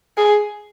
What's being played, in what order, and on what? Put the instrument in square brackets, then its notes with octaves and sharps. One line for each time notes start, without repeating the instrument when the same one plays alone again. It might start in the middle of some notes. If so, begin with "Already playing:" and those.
[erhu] G#4